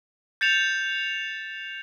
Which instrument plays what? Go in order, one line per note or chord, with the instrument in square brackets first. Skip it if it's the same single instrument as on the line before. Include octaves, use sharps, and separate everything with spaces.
[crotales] G6 A6 C#7 E7 F7